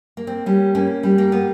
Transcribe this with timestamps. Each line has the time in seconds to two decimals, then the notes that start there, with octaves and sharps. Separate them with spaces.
0.17 A#3
0.27 C4
0.46 G3 C#4
0.75 A#3 C#4
1.03 G3
1.18 A#3
1.32 A#3 B3